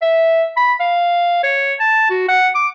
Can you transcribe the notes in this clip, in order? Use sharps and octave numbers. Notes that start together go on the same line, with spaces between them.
E5
B5
F5
C#5
A5
F#4
F#5
D6